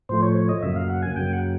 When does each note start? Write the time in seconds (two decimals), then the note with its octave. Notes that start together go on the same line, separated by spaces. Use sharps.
0.09 A2 F3 A3 C5
0.22 C#5
0.36 C#5
0.49 D#5
0.62 F#2 C#3 F#3 A#3 E5
0.76 F5
0.89 F#5
1.02 G#5
1.16 F#2 C#3 F#3 A#3 G5
1.33 F#5